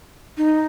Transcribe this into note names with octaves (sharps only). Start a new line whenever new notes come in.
D#4